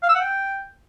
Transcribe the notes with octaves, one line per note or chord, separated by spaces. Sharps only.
F5
E6
F#5
G5